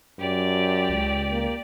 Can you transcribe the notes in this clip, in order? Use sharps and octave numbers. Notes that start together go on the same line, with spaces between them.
F#2 G4 D5
C#2
A#3